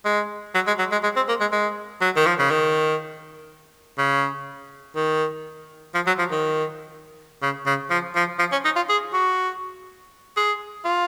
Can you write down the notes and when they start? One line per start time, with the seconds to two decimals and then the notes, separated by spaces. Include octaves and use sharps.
0.05 G#3
0.54 F#3
0.67 G#3
0.79 F#3
0.92 G#3
1.04 G#3
1.16 C4
1.29 A#3
1.41 G#3
1.52 G#3
2.01 F#3
2.16 D#3
2.26 F3
2.39 C#3
2.51 D#3
3.98 C#3
4.96 D#3
5.95 F3
6.07 F#3
6.19 F3
6.31 D#3
7.42 C#3
7.66 C#3
7.90 F3
8.16 F3
8.39 F3
8.52 C#4
8.65 D#4
8.76 F4
8.89 G#4
9.14 F#4
10.37 G#4
10.85 F4